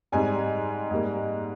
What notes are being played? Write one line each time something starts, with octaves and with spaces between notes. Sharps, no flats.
G#2 G3 C4 G#5
G#2 G3 A#3